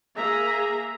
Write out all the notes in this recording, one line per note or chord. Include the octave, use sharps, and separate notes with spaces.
A#3 G#4 E5 A#5